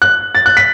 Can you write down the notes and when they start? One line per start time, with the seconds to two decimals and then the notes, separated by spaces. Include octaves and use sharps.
0.02 F#6
0.35 A6
0.46 F#6
0.57 B6